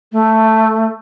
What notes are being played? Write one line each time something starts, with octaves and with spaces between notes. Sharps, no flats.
A3